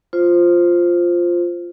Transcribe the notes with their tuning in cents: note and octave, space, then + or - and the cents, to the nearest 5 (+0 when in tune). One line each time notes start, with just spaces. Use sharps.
F4 +0 C5 +0